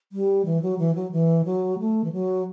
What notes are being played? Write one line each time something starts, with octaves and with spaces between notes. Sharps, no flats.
G3
E3
F#3
E3
F#3
E3
F#3
A3
E3
F#3